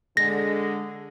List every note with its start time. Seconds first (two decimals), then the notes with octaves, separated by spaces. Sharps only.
0.17 D3 G#3 A#6